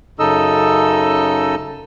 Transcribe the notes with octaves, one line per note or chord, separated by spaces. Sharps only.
F#2 C#3 D#4 A4 D#5 E6